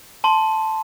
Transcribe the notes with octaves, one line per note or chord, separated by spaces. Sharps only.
A5 C6